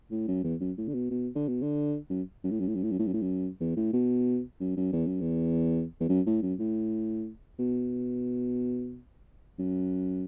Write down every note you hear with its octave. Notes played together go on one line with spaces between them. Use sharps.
A2
F#2
E2
F#2
A2
D3
B2
B2
D3
B2
D3
F#2
F#2
A2
F#2
A2
F#2
A2
F#2
A2
F#2
A2
F#2
E2
A2
B2
F#2
F#2
E2
F#2
E2
E2
F#2
A2
F#2
A2
B2
F#2